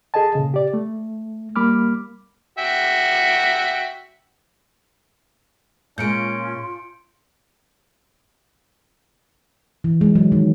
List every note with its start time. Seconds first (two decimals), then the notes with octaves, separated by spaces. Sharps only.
0.14 G#4 A4 D#5 G#5 A5
0.35 A#2 C#3
0.54 G4 D5
0.74 A3
1.56 G3 A#3 B5 D6 F6
2.58 F#4 E5 G5
5.98 A#2 G#3 C#4 F4 G6 C#7 D7
9.84 E3
10.01 G#3
10.15 F#3
10.32 D#3